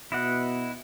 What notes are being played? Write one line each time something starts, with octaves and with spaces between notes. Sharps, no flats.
B2 E4 D#5 F#5